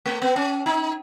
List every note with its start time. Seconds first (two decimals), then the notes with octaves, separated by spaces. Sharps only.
0.06 A3
0.22 B3
0.36 C#4
0.66 D#4